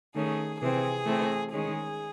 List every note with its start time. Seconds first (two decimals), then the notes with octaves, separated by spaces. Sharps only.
0.14 D#3 A3 C#4 G#4
0.60 C3 E3 C4 G#4
1.05 E3 A3 C4
1.51 D#3 G#3 C#4 G#4